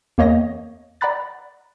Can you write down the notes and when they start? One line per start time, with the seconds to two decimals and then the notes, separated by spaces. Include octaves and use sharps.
0.18 E2 A#3 C#5 D#5 G5 A#6
1.01 D5 F#5 A#5 B5 F#6 A6